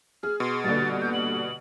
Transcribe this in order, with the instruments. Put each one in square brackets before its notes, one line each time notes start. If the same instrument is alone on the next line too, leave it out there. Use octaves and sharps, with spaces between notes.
[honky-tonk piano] G#4 [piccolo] F6
[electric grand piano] B2 [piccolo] C6
[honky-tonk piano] G2 A#2 D3 [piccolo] A6
[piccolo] G6
F#7